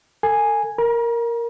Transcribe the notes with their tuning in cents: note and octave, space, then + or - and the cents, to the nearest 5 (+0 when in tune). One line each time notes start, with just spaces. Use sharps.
A4 +35 G#5 -5
A#4 +0 A#5 +40